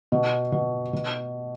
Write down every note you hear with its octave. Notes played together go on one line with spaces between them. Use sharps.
B2
B2
B2